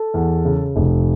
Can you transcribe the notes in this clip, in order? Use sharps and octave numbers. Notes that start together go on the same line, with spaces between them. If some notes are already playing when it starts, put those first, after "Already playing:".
Already playing: A4
E2
C#3
F1